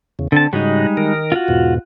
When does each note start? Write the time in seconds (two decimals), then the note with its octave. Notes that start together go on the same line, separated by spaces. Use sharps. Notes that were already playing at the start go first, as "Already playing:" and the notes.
0.19 E2 C#3
0.32 D3 C4 A5
0.53 G#2 C#3 G3 G#3 D#4 F#4
0.97 D#3 A#4
1.32 F4 F#4
1.48 E2 G#2 B2